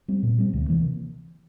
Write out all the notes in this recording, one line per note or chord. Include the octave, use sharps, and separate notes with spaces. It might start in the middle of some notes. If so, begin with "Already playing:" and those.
G3 C4
A#2
G3 C4
D2
C3 E3 A#3